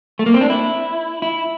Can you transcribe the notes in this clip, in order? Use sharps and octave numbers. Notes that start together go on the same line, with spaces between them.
A3
A#3
C4
D4
E4
E4